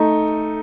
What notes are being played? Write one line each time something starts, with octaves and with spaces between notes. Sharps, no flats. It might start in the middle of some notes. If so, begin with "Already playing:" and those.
Already playing: A3 D#4